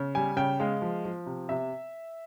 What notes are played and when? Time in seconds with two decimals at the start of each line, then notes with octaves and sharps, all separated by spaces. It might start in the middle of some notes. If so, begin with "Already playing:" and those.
Already playing: C#3
0.15 G3 G#5
0.37 C#3 G5
0.60 G#3 F5
0.82 F3
1.05 F3
1.26 C3
1.49 C3 E5